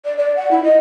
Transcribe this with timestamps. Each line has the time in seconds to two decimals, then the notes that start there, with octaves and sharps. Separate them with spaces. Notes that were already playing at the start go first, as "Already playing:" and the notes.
0.05 D5
0.17 D5
0.36 F#5
0.51 E4
0.63 D#5